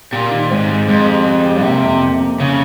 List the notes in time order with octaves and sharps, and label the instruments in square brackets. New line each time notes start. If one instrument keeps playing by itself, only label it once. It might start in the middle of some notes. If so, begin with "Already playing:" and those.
[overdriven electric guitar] A#2 [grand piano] G4
[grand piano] D#3
[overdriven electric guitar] G#2 [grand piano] C4
[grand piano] G#3
[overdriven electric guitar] F2 [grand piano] G#3
[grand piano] G4
G#3
G4
[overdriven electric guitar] C3 [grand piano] A#3
[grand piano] F2
A#3
A#3
[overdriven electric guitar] C#3